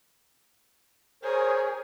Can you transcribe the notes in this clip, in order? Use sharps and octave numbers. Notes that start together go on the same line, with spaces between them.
G#4 A#4 C5 C#5